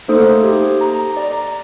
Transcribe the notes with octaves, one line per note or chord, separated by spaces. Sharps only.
A3 A#3 D#4 A4 C5 D#6
G4
A#5
D5 A#5